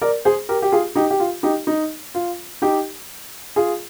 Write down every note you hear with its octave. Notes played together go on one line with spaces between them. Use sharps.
A#4 D5
G#4 C5
G4 A#4
G4
F4 G#4
D#4 G4
G4
F4
D#4 G4
D#4
F4
D#4 G4
F4 G#4